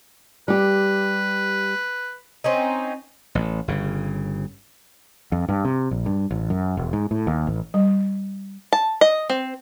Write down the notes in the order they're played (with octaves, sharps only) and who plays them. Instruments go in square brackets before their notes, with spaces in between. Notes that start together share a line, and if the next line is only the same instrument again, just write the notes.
[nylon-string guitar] G3 G4 [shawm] B4
[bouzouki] C4 C#4 D#4
[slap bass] A1
G1 C#3
[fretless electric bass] F2
G2
C3
A#1
G2
A1
F#2
E1
G#2
A2
D#2
A1
[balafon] G3
[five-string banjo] A5
D#5
C4